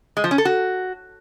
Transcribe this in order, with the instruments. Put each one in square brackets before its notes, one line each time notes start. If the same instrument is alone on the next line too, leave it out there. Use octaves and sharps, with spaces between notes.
[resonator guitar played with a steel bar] G#3
F3
C#4
A4
F#4